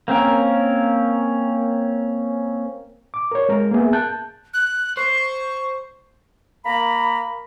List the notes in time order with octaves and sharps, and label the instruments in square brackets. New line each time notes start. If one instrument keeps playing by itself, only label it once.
[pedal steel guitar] A#3 C4 C#4 A#4
[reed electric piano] D6
A#4 C#5
G#3 A#4
A#3 B3 G#4 E5
A5 F#6 G6
[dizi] F#6
[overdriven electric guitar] C5 [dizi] C#6
[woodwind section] A#3 A#5 B5